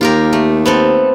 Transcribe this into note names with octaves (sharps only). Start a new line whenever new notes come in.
D#2 F4 G4 A#4
A3
B3 C4 A4